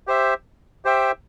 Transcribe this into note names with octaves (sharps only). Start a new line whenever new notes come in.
G4 C5 E5
G4 C5 E5 G5